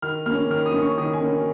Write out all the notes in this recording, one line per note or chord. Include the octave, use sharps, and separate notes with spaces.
D#3 F6
A#3 F6
C#4
D#3 F6
D#6
A#3 C#4
C#6
D#3 D#6
G#5
A#3 C#4
G#5